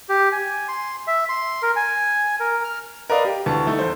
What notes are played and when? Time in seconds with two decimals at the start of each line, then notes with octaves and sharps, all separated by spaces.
0.09 G4
0.32 G#5
0.68 C6
1.07 E5
1.29 C6
1.62 A#4
1.76 G#5
2.40 A#4
2.64 F6
3.10 A#4 B4 D5 D#5 F5
3.25 G4
3.46 D2 E3 A5 C#6
3.67 A3 D#4
3.79 E2 C5